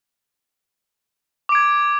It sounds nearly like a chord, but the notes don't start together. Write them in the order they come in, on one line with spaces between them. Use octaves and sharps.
D6 D7 G#6